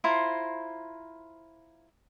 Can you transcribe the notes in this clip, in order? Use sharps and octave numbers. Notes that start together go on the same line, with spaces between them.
E4 F4 C5 A#5